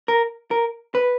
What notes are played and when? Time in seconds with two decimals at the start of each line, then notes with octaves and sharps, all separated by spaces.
0.08 A#4
0.51 A#4
0.95 B4